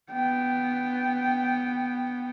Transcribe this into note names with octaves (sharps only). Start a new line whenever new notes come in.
B3 G5